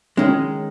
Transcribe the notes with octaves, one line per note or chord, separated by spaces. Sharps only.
D#3 G#3 C#4